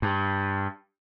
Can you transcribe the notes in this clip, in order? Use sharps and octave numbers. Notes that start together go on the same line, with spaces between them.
G2